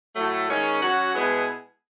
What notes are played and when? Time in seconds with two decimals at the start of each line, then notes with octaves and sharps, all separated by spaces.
0.16 A2 F#3 A3
0.49 D#3 G#3 C#4
0.82 F#3 C#4 F#4
1.14 B2 G#3 B3 E4 G#4